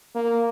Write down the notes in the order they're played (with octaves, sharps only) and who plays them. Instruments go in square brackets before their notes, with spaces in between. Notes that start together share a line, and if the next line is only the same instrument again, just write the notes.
[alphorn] A#3